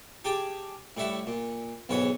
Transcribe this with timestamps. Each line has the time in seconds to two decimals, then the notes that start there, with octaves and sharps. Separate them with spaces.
0.24 G4 G#4 G5 A5
0.97 A2 G3 E4 E5 F#5
1.27 A#2
1.89 B1 E2 G#2 B4 C#5 F#5